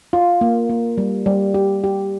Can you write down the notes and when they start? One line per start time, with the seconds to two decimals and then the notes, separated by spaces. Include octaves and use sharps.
0.13 F4
0.41 A#3
0.70 A#3
0.98 G3
1.26 G3
1.54 G4
1.84 G4